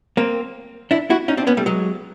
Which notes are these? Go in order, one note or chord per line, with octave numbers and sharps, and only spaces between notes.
A#3 C4
D4 E4
E4 F#4
C#4 D#4
C4 D4
B3 C#4
G3 A3
F#3 G#3